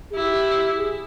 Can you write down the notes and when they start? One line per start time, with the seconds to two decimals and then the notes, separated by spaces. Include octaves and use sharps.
0.11 G#4
0.15 E4 G4
0.76 G#4